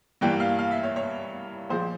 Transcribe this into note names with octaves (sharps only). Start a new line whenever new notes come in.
G2 E3 G3 A#3 G5
F5
F5
E5
C#5
C#5
A#2 F3 G#3 C5